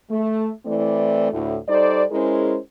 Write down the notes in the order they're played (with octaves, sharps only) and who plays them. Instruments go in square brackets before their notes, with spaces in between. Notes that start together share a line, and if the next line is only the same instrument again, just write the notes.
[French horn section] A3
E3 A3 C4 E4 D5
D2 A2
G3 D#4 A4 C5 D5
G#3 C#4 E4 G#4 A#4 C5